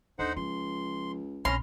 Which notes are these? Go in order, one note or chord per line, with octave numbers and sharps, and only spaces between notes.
D#2 D3 D#4 C5 F#5
C#2 F3 C6
A#1 C4 C#4 A#5 C6 F6